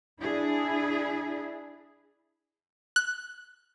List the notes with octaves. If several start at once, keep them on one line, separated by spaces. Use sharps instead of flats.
D4 E4 G#4
F#6